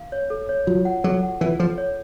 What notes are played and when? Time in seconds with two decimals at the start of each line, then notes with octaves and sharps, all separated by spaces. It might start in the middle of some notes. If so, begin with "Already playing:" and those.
Already playing: F5
0.12 C#5
0.30 A4
0.49 C#5
0.67 F#3 F4
0.85 F#5
1.04 F#3 A4
1.23 F#5
1.41 E3 F4
1.59 F3 A4
1.78 C#5